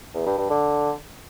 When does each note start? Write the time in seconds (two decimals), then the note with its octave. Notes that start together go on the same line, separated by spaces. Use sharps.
0.14 E2
0.26 G2
0.38 G2
0.50 D3